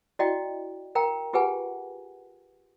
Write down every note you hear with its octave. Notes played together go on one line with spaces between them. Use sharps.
E4 F#4 D5 D#5 G5
A#4 F5 G5 A#5
F4 G4 G#4 B4 F#5 G#5